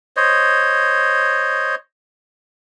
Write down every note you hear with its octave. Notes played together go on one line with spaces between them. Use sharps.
C5 C#5 D#5